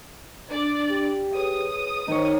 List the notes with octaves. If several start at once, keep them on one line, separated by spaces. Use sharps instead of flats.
D4 D5
G4
G#4 B4 C#5 D#6
D#3 D#4 C#5